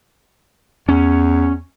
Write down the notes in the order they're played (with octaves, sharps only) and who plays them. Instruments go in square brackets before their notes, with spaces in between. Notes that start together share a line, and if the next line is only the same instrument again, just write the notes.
[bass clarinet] E2 [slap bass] C#4